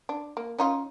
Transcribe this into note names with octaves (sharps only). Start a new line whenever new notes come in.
D4
A#3
C#4 D#4 F4